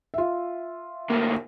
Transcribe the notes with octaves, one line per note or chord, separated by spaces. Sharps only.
F4 E5
D2 A#3